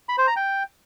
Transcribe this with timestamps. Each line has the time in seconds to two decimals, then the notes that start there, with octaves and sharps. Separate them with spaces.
0.09 B5
0.18 C5
0.27 A#5
0.36 G5